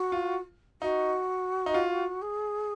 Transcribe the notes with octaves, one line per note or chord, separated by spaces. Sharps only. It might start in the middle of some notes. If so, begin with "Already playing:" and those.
Already playing: F#4
F4
D#4 F#4
D#4
F4
G#4